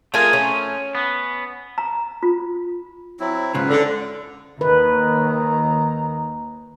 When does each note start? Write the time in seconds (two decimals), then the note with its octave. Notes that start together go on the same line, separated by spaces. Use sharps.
0.14 A3 F4 G#4 A#4 G#5
0.33 C#4
0.95 B3
1.78 A#5
2.23 F4
3.20 F#3 C4 E4
3.55 G#2 C#3 F#3 F4 B4
3.70 D3
4.61 D#2 D#3 B4 A#5